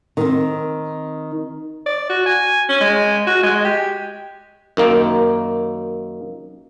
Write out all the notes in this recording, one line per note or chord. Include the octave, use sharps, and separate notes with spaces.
D#3 C4
D5
F#4
G#5
C#4
G#3
F#4
G#3
G4
F#2 D#3 A#3